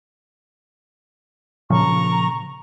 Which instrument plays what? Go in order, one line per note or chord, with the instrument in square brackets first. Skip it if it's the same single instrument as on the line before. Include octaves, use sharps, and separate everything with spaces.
[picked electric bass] A#2 C#3 F3 [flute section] A#5 C#6